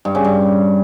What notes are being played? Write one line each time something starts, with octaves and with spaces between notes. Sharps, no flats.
G2
C#3
G2